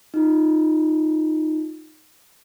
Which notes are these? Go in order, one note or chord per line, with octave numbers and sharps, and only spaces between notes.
D#4 F4